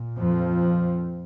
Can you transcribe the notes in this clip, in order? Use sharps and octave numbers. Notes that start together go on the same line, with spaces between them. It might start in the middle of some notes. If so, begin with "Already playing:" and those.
Already playing: A#2
F2 F3